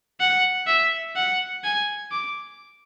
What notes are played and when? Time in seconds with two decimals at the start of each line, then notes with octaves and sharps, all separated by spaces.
0.20 F#5
0.67 E5
1.16 F#5
1.64 G#5
2.12 D6